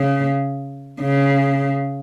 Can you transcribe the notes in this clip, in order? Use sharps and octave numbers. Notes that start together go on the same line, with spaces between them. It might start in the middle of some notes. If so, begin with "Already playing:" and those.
Already playing: C#3
C#3